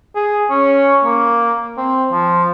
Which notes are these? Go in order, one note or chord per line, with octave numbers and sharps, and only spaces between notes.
G#4
C#4
A#3
C4
F3